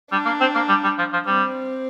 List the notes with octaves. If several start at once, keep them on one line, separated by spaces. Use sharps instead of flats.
G3 D4
A#3
C4
A#3
G3
G3
F3
F3
G3 C4